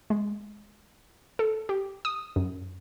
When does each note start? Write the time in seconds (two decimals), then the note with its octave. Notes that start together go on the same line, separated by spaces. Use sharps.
0.10 G#3
1.39 A4
1.69 G4
2.05 D#6
2.36 F#2